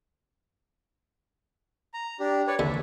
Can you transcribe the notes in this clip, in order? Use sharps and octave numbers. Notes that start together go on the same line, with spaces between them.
A#5
D4 G4
B4 C#5 D5
D#2 D3 E5